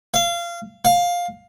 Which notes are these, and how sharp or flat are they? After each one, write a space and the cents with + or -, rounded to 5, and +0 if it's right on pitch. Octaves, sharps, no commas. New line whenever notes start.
F5 -25
F5 +10